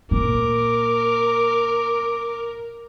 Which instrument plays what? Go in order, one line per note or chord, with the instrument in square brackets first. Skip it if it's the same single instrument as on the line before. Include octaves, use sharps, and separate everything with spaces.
[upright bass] A#2 [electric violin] A#4 [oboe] D6